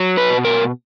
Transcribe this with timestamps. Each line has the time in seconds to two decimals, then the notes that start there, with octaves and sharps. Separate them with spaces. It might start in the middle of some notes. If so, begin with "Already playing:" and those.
Already playing: F#3
0.17 B4
0.30 B2
0.45 A#4